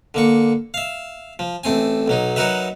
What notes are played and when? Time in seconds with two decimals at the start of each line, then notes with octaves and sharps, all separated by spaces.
0.14 D3 A#3 C#6
0.74 E5 F5
1.39 F3
1.64 A1 A3 C4 G#5
2.08 B1 F#3 D#4
2.36 F#3 D#4 F#4 A#4 B4 E5